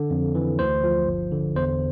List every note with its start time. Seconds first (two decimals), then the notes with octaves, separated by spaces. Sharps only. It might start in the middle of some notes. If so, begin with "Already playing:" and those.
Already playing: D3
0.10 F2
0.35 E3
0.59 D2 C5
0.83 F3
1.07 G1
1.32 D3
1.56 E2 C5